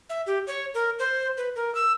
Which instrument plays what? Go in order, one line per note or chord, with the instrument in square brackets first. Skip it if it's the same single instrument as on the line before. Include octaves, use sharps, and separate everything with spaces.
[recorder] E5
G4
C#5
A#4
C5
B4
A#4
E6